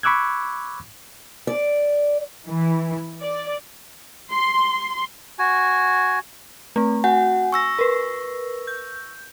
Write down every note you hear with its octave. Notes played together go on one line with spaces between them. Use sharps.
B5 C#6 D6 E6 F#6 G#6
D5
E3
D5
C6
F#4 G#5
A3 C4
F#4 F#5 G#5
C#6 E6 A#6
A#4 B4
G6